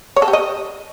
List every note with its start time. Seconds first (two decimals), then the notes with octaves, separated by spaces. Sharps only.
0.16 C#5
0.22 A4
0.28 G4
0.33 D#5